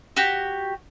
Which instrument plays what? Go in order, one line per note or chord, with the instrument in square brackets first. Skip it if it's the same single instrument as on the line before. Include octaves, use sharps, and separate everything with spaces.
[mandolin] F#4 G4